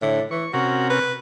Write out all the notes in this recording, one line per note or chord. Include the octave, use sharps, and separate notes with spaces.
A2 D3
E3 C#6
C3 C#4 F#4 A#4
B4